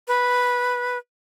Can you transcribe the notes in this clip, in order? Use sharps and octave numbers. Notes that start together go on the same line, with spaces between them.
B4